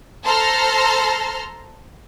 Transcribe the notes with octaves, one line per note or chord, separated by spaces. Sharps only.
A4 C5 A5 A#5 C6 F6